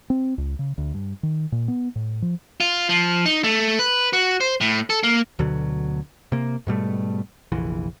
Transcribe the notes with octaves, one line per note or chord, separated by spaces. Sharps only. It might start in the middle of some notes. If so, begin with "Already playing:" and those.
C4
C#2
C#3
D2
G2
D#3
A#2
B3
A2
F3
F4
F3
D#4
A3
B4
F#4
C5
A2
A4
A#3
D2 B2 D3 F#3
C3 A#3
G#2 B2 G3 A3
F1 A#1 E3